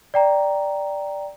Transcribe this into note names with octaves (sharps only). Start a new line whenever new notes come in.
D5 G5 A#5